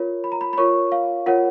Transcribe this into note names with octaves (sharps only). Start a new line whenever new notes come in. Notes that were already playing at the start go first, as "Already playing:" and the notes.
Already playing: F4 A#4 C#5
B5
A#5
B5
B5
F4 A#4 C#5 C#6
F5
F4 A#4 C#5 F#5